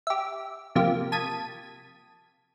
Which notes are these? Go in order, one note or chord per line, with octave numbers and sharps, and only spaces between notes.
G4 E5
C3 F3 A#3 G4
A5 D#6 G#6 B6 D#7